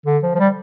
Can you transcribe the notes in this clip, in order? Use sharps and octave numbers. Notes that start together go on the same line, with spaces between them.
D3
F3
F3
G3